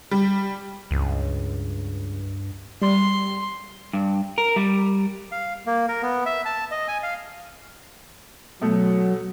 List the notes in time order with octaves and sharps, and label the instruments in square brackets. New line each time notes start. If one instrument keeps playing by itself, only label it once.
[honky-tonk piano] G3
[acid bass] C#2 [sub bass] G2
[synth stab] G3 [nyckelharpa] C6
[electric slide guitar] G2
A#4
G3
[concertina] F5
A#3
A#4
B3
E5
A5
D#5
G#5
F5
[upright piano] B2 A3 [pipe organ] F#3